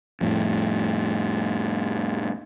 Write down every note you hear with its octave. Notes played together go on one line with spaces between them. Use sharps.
F2 A2